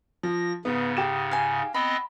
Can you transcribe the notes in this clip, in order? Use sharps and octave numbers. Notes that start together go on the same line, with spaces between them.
F3 A#6
G#2 C#3 B3
G4 E7
F5 G#5
B3 C4 D#5 B5